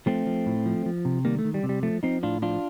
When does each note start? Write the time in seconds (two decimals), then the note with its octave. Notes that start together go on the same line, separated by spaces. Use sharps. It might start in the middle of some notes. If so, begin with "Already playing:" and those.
0.06 F3 A3 C4
0.27 F3
0.46 A2
0.66 F3
0.86 F3
1.05 C3
1.25 D#3 G3 A#3
1.39 A3
1.45 D#3
1.54 G3
1.63 C3
1.69 G3
1.83 F3 A3
2.03 F3 C4 D#4
2.23 A2 D4 F4
2.42 F3 D4 F4